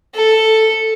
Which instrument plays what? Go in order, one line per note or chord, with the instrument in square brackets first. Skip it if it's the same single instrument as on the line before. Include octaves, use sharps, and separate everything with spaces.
[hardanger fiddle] A4